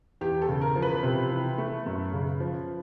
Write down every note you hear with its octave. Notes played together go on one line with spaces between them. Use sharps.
E2 G4
A4
C#3
A#4
F3
B4
C3
E3
A3
F#2
C#3
F3